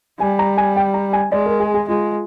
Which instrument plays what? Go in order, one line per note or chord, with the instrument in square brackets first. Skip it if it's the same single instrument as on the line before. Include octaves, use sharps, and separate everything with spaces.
[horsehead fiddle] G3 [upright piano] G#5
[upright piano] A#5
G#5
G5
A#5
G#5
[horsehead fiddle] G#3 [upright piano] D5
[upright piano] A#4
G#4
G#4
[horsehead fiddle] G#3 [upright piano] F4